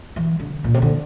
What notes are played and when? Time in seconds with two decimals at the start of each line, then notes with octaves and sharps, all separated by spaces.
0.16 E3
0.39 D3
0.64 A#2
0.74 C3
0.82 D3